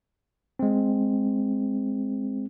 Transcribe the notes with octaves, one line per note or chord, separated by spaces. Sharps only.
G#3 C4